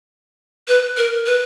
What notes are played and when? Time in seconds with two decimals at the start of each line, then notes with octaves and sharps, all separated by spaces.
0.68 B4
0.97 A#4
1.26 B4